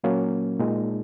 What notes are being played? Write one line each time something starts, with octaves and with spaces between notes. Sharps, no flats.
A#2 F#3 A#3 C#4
A#2 G#3 D#4